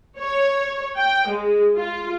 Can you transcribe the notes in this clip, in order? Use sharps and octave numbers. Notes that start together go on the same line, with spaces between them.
C#5
G5
G#3
F4